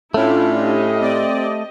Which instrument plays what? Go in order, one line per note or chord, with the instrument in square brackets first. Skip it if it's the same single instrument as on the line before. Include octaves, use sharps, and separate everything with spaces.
[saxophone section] A2 C#4 [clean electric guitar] A3 [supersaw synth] D4 F4 [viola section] E4
[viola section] G4 D#5
[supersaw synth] C4 D5